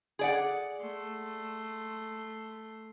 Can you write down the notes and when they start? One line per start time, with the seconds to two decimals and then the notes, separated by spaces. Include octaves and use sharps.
0.19 G#4 D5 F#5
0.80 A3 C6